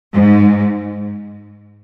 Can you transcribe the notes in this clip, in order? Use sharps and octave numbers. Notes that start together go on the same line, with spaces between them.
G#2